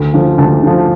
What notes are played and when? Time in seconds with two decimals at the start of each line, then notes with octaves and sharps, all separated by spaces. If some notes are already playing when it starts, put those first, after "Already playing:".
Already playing: D2
0.14 D3 F3
0.38 D2 A5
0.63 D3 F3